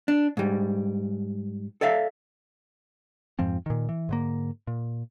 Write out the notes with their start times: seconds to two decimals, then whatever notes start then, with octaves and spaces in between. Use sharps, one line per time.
0.08 D4
0.37 G#2 G3
1.81 A4 D5 E5 F5
3.39 F2 G#2 F3 C4
3.66 A#2 D#3
3.89 E3
4.09 G#2 D3 A#3
4.67 A#2